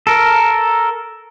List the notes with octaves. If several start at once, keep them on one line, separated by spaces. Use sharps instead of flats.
A4 A#4